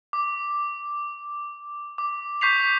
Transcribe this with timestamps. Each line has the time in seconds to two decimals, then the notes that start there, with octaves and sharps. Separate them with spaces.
0.13 D6
1.98 D6
2.41 C#6 G6 B6 C7 F7